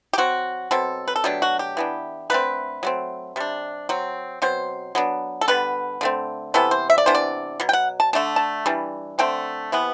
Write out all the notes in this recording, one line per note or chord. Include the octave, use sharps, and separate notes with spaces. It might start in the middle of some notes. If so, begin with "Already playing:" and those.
G4
F#3 C4 F#4
B2 F#3 C4 A4
B4
A4
B2 F#3 A3 D4 G4
F#4
G4
E3 B3 D4
D3 A3 C4 B4
F#3 A3 C4
C3 G3 D4
F#3 C4
B2 F#3 C4 C5
F#3 B3 D4
A4
D3 G3 B3 B4
D3 A3 C4
C3 E3 B3 A4
C5
E5
D5
C3 E3 B3 D4 C5
D5
B2 F#3
G5
F#5
A5
D3 A3 D4 A5
A5
E3 G3 D4
D3 A3 C4 G5
C3 E3 B3